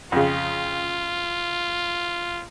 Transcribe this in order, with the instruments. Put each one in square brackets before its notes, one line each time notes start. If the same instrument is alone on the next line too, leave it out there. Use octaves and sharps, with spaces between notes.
[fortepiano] F2 C#3 [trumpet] F4